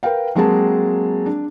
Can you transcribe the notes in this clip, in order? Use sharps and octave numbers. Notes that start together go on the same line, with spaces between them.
A#4 B4 F5 G5
F#3 G#3 A#3 C4 G#4 A5
D4